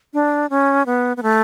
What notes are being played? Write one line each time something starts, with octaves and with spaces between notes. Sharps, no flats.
D4
C#4
B3
B3
A3